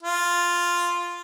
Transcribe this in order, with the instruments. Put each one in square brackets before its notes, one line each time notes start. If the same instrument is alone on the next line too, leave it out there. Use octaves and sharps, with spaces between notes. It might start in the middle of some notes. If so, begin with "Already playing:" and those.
[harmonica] F4